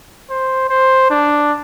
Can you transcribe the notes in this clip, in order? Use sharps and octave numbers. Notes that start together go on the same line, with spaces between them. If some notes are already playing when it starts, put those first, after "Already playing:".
C5
C5
D4